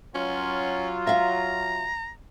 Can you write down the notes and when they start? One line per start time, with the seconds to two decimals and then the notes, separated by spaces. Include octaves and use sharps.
0.15 F#3 C#4 F4
1.07 E5 F5 A#5